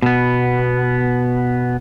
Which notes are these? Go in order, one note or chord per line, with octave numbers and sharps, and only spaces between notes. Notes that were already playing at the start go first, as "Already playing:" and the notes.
B2 B3